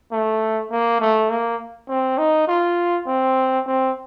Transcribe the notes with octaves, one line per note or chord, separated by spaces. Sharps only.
A3
A#3
A3
A#3
C4
D#4
F4
C4
C4